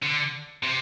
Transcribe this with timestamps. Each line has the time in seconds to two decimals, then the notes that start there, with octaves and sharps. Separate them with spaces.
0.02 D3
0.63 C3